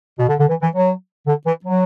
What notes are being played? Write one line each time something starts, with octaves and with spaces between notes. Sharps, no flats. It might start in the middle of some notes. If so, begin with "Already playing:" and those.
B2
D3
D3
E3
E3
F#3
D3
E3
F#3